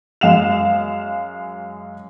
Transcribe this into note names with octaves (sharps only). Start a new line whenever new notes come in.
F#2 G#3 F5 E7 F7